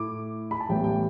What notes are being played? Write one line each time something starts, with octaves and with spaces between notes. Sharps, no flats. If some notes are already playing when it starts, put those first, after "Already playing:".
Already playing: A2 A3 E4 D6
B5
A5
A1 A2 E3 G3 B3 G5
G5